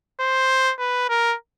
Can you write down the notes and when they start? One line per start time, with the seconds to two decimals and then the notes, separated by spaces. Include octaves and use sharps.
0.20 C5
0.79 B4
1.09 A#4